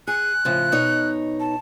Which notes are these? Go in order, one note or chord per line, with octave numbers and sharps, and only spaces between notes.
G#4 F#6
A2 C#3 F3
B2 D#4 C#5
A5